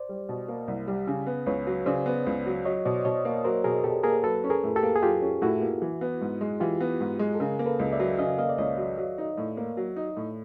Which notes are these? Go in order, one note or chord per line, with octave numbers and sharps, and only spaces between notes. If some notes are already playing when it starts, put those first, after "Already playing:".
Already playing: C5 D5
G3
B2
A#3
C2
G3
C#3
B3
C#2 B4 C#5
F#3
C#3 C5 D5
B3
C#2
F#3
F#3 C#5 D#5
B2 C5 D5
B2 C#5 D#5
A#3
F#3 A#4 C5
B2 G#4 A#4
B2 G4 A4
A#3 G#4 A#4
F#3 A4 B4
C#4
G#4 A#4
A2
G4 A4
A#3
G#4
F#3 F4 G4
C#4
A2 E4 F#4
A#3
E3
B3
G#2
G#3
E3 F4 G4
B3
G#2
G#3
A4
C#3 G#4 A#4
A#3
A4 B4
C#2 D#5
D5 E5
F#3
C#3 D#5 F5
A#3 D#5 F5
D5
C#2 C#5 D#5
F#3
F#3
D#4
A2
A#3
F#3
D#4
A2